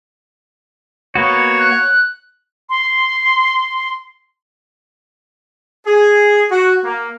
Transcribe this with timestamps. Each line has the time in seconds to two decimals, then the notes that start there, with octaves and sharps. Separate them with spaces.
1.15 A#3 B3 F#4 C#5
1.59 F#6
2.70 C6
5.87 G#4
6.52 F#4
6.85 A#3